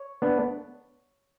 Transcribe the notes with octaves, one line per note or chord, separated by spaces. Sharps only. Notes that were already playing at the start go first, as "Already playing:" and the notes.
Already playing: C#5
B3 D4